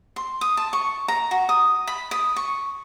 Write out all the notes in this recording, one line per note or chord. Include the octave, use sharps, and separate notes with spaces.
C6
D#6
A5
C#6
A#5
F#4
D#6
B5
D#6
C#6